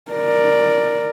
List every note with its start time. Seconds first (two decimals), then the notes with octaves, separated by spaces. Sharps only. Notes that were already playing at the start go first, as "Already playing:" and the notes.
0.12 A#4 D5